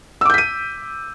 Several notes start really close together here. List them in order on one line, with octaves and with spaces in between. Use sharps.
E6 D6 G6 B6 D#7